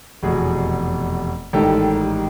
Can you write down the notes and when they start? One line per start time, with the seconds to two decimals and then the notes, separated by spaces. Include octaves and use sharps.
0.23 F1 E2 B2 F#4 G#4
1.53 A1 G#2 D#3 G3 G4 A4